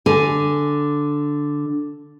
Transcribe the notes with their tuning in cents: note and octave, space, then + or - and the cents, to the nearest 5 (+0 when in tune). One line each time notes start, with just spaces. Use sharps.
D3 +0 G#5 +0